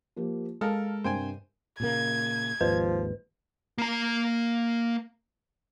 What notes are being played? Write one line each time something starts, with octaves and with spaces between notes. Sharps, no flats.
F3 A#3 G4
G#3 A4 A#4 F5 A5 F6
G2 C3 A#4 C5 G5 G#5
A#2 C#3 A#3 G#6
G#1 D#2 G#2 F3 B4
A#3 A#5